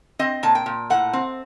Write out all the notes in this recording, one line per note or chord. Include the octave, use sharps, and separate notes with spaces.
C4 D#5
A#2 A5
G5
A#2
A2 F#5
C4